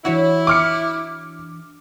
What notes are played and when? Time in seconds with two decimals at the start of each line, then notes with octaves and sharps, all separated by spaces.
0.05 E3 D4 E4 F#4 C#5
0.47 D6 F6 C#7